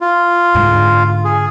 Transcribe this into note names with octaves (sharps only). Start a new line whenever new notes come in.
F4
G#2 D3
G#4